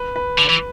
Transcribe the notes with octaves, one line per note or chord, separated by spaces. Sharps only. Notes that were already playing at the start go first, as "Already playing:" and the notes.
Already playing: B4
B4
D3
E3